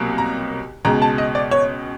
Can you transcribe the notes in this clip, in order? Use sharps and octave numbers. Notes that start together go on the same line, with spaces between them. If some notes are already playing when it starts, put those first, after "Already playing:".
Already playing: C2 B2 F#3 A#3
A#5
C#2 B2 G#3 A#5
A5
D#5
D5
C#5